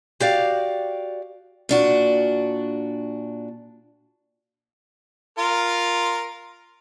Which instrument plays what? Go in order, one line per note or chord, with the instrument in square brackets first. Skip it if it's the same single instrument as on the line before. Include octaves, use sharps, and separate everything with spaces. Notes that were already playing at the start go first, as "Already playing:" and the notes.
[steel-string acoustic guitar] F#4 G4 D5 F5
A#2 D4 F#4
[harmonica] F4 A#4